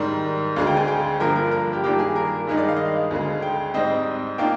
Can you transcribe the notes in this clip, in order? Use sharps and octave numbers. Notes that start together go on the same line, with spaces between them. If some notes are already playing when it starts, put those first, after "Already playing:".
Already playing: G#2 D#3 G3
D2 D3 G#3 F5
G5
G#5
G5
G2 D3 F3 A#3 A#4
A#4
A#4
G4
G2 D#3 A#3 D4 F4 G4
G#4
A#4
G2 D#3 G#3 D#4
D5
F5
D#5
F5
D2 D3 G#3
G5
G#2 G3 C4 D#5
D#3 A#3 D4 F4 G5